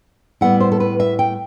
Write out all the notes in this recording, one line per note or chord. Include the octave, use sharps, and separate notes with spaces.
A2 G3 B3 E4 F#5
C5
A4
B4
E5
G5